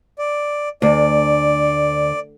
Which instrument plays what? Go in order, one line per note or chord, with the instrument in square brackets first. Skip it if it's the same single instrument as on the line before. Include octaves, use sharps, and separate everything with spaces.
[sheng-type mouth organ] D5
[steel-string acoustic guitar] D2 [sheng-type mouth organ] D5